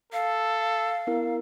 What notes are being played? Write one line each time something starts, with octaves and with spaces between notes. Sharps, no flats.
A4 F5
B3 E4 A#4